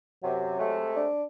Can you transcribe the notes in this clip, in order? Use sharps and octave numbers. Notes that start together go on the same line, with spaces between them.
F#2 C3 F#3
C3 G#3 A3
D4